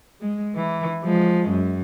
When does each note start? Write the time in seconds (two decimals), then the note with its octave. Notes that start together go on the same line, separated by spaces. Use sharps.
0.21 G#3
0.55 E3
1.04 F3 G#3
1.49 F#2